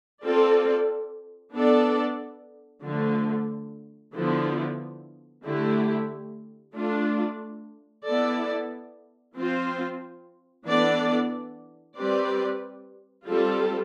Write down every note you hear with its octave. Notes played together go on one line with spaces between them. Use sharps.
C4 F4 A4 D5
B3 D4 A4 D5
D3 F3 A3
D3 F3 B3 E4
D3 A3 E4 G4
A3 D4 F4
B3 E4 A4 D5
F3 C4 F4 C5
E3 B3 D4 A4 D5
G3 C4 G4 B4 D5
G3 C4 F4 A4